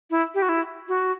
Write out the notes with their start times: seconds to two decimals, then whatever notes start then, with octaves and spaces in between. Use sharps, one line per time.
0.10 E4
0.35 G4
0.42 F#4
0.49 E4
0.88 F#4